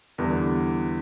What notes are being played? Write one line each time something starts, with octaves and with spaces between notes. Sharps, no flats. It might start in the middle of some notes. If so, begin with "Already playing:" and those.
E2 D3 G3 B3